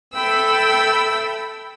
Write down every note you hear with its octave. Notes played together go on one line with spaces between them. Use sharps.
A4 E5 G5 B5 E6